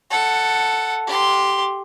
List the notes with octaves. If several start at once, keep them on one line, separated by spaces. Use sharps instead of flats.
A4 F#5
G4 C6